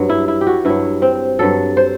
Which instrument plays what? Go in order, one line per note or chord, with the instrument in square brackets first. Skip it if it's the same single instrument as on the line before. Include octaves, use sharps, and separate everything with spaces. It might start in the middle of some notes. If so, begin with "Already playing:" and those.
Already playing: [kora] G2 F#3
E4
E4
G4
F#4
G2 F#3 E4
C4
G2 F#3 A4
C5